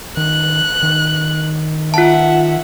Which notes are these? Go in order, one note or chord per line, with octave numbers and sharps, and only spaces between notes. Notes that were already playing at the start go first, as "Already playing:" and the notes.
D#3 F#6
D#3
F4 E5 F#5 A5